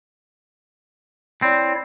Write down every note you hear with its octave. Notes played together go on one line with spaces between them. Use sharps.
C4 E4 C#5 D5